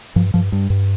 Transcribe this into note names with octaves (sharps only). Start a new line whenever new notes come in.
G2 F3
G2 F3
G2
G2